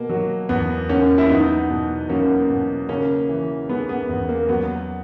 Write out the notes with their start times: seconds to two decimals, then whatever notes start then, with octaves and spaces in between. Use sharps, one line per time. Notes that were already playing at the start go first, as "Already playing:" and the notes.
Already playing: B2 A#3
0.09 F#3
0.49 E2 B3
0.89 E2 A#3 C#4
1.18 E4
1.29 F#3 B3 D#4
1.69 B2
2.09 F#3 A#3 C#4
2.49 B2
2.89 C#3 A#3 C#4
3.29 E3
3.69 G#3 B3
3.89 B3
4.09 E2
4.29 A#3
4.49 F#3 B3